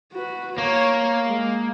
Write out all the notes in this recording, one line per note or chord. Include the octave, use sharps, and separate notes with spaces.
F#4 B4
A#3 C#5
G#3